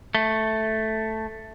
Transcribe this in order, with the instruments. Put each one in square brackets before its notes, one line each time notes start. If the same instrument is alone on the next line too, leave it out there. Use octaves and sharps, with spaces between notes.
[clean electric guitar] A3